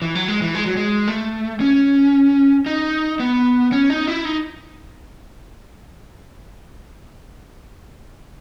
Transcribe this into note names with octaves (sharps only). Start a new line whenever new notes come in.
E3
F#3
G#3
E3
G#3
F#3
G#3
A3
C#4
D#4
B3
C#4
D#4
E4
D#4